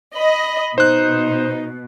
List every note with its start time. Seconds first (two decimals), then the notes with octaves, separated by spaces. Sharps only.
0.16 D#5 B5
0.78 B2 D#4 C5 F#6